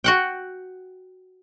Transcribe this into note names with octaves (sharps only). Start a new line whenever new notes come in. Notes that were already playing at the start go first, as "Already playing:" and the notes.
F#4 F#5 G5